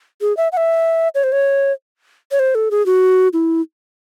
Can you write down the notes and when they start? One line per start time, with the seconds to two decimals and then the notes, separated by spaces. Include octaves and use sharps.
0.21 G#4
0.37 E5
0.52 F#5
0.57 E5
1.15 C#5
1.24 C5
1.32 C#5
2.32 C#5
2.39 C5
2.55 A4
2.71 G#4
2.86 F#4
3.33 E4